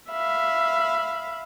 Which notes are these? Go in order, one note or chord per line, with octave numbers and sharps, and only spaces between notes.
E5 F5 B5